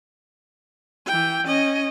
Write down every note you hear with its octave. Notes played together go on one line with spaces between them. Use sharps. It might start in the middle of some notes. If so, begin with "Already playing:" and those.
E3 G5
C#4 D#5